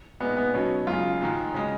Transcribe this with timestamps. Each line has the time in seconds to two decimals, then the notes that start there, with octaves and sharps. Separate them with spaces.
0.20 A#2 G#3 B3 D#4
0.37 B3
0.54 B2 F#3 B3 C#4 D#4
0.87 F#2 C#3 G#3 F4
1.21 G#2 D#3 G#3
1.54 C#3 G#3 D#4